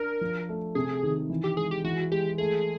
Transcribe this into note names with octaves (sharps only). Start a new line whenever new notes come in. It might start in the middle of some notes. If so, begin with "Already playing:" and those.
Already playing: D4 A#4
F3
A3
C3 G#4
D#3
E3
G4
G#3 G#4
G4
E3 F#4
G#3 G4
A3 G#4